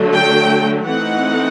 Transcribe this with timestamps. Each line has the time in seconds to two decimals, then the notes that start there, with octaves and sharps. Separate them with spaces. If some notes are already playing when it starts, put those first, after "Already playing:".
Already playing: D3 F#3 A3
0.13 G5
0.86 E3 A3 C4 D#4 F#5